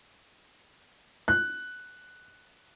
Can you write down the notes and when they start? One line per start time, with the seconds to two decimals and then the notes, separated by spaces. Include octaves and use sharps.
1.28 F#6